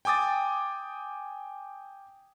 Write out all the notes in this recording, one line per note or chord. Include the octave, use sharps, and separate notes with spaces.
G5 G#5 D6 D#6 A6